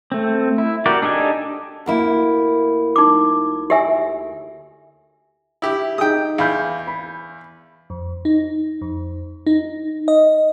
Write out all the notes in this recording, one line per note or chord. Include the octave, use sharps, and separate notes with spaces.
A3 C4
E4
F#4 G4 A#4 D5
D4 D#4 G4 A4 G#5
D2 A#3 E4
D#4 D6
G4 E5 G#5
E4 G4
D#4 G#4 G5 D#6
E2 F5 B5 G6
B5
F2
D#4
F2
D#4
D#5